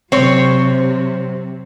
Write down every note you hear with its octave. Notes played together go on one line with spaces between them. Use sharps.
C3 F#3 C4 C#5